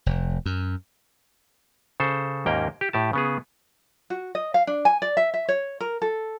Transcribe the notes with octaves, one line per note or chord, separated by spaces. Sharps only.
F1
F#2
C#3 A4 C5
D#2 G#2 A#3 C#4 G5 A#5
G4
A2 G4 A5
C#3 B3 G#4
F#4
D#5
F5
D4
G#5
D5
E5
E5
C#5
A#4
A4